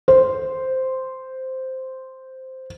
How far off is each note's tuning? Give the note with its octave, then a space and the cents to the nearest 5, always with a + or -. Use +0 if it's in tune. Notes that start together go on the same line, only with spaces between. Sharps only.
C5 -5